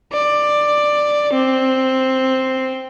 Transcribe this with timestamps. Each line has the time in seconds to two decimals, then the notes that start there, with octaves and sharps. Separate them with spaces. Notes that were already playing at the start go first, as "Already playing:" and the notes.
0.13 D5
1.33 C4